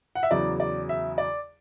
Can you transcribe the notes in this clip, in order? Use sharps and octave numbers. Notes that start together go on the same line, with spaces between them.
F#5
E5
E2 C#3 F#3 D5
D5
E5
D5